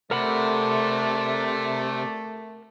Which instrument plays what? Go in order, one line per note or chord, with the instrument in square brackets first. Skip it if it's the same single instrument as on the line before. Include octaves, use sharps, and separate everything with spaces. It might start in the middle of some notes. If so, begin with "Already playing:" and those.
[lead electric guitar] C3 [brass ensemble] A3 [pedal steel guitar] A#4 F#5 B5 [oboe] D5